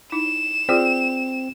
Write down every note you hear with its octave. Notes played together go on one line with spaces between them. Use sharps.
D#4 E4 E7
C4 F4 G#4 D5